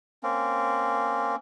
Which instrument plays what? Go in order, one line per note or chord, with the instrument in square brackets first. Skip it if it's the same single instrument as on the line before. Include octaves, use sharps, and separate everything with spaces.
[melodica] A#3 C4 C#4